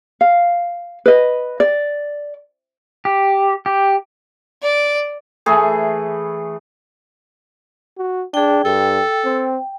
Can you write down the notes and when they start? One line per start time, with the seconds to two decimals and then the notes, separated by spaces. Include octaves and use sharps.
0.21 F5
1.06 B4 D#5
1.60 D5
3.05 G4
3.66 G4
4.61 D5
5.46 E3 A3 G#4
7.98 F#4
8.34 D4 G#4 G5
8.65 G2 A4 G5
9.25 C4